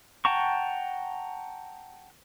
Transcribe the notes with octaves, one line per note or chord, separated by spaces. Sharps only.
F#5 G5 A5 A#5 C#6